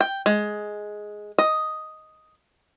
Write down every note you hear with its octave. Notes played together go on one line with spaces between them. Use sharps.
G5
G#3
D#5